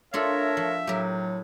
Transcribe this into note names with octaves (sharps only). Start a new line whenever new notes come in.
A3 D4 F4 A4 A#4 C#5 E5
F3
A2 F#3 G4 A#4